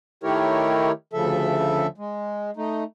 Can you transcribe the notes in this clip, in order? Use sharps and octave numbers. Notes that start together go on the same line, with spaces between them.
D#3 A3 E4 G4 A#4 C#5
D2 C#3 F3 A4 E5
G#3
A3 D#4